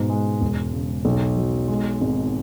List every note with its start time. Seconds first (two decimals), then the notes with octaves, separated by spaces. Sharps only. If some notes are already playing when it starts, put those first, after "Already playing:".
Already playing: G#2 B2
0.09 G#3
0.41 E1
0.73 C#3
1.05 B1
1.37 F#3
1.68 G#3
2.01 G#1